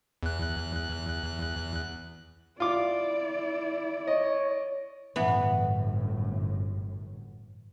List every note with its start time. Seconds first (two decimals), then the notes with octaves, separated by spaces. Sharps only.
0.23 E2 F#6
2.60 E4 F4 D5 D6
4.07 C#5 D#5
5.16 G1 F#2 A2 E3 B3